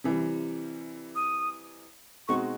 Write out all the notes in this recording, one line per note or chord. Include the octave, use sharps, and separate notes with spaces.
C3 E3 G3
D#6
B2 G#3 C4 D#4 F#4 C#6